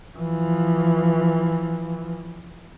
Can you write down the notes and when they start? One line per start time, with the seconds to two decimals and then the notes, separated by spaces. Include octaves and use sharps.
0.16 E3 F3